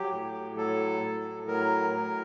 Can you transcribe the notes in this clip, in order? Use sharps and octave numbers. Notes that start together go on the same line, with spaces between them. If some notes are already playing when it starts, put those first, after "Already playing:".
Already playing: F#3 G4
A2
F#3 A4
A2
F#3 A#4
A2